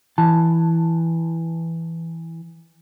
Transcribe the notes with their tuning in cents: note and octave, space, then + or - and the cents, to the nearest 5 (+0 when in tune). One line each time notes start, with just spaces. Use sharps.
E3 +0 A5 +0